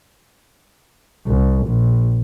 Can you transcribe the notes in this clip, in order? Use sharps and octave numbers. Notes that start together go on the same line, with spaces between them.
C2
A#1